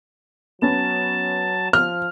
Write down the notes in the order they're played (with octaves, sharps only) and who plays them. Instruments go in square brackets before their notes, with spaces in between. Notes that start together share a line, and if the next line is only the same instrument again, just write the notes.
[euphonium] F#3 [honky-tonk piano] B3 C#4 [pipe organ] A5
[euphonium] F3 [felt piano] F6